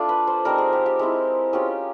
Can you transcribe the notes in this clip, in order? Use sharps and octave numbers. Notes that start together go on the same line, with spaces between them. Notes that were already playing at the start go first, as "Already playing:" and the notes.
Already playing: A3 D4 F4 D5
B4
C5
G3 C4 D#4 A#4
G#4
G4
G4
G#3 C4 E4
G#3 C#4 F4 G4